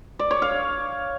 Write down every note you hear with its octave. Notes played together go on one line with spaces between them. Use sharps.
D5
C#5
F5